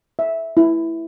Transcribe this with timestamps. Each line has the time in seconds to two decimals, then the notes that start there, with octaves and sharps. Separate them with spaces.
0.19 E5
0.57 E4